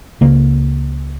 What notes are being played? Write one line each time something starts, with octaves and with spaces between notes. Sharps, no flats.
C#2 C#3 A#3